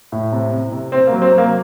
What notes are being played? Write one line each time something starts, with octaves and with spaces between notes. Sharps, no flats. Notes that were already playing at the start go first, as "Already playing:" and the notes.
A2
C3
C3
C3
C3 C4
A#3
F#3
C4
F#3
A#3